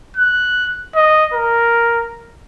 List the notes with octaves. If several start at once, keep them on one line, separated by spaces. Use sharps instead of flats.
F#6
D#5
A#4